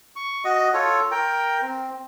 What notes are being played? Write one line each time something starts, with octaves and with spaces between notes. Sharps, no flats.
C#6
F#4 D#5
F4 A4 C#5
A#4 G5
C4